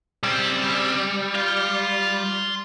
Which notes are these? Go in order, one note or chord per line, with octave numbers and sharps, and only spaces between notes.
C#3 G3 C4
F4